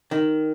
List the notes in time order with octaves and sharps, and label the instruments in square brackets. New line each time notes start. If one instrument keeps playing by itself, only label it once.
[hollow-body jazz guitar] D#3